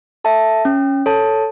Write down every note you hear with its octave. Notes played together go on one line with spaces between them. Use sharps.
A4 E5 A5
C#4
A4 C#5 A5